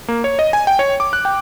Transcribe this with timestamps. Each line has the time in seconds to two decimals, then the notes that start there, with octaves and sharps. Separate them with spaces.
0.08 A#3
0.24 C#5
0.39 D#5
0.53 G#5
0.67 G5
0.79 C#5
1.00 D6
1.13 F#6
1.25 G5